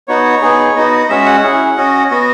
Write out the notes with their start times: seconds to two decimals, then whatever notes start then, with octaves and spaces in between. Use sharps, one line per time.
0.08 B3 D#4 F#4 C#5
0.42 B3 D#4 G#4
0.76 B3 D#4 F#4 D#5
1.09 G#3 C#4 F#4 E5
1.26 F#5
1.43 C#4 E4 G#4
1.77 C#4 F#4 D#5
2.11 B3 F#4